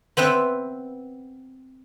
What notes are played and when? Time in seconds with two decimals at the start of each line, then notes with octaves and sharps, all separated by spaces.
0.17 B3 C4 B4 E5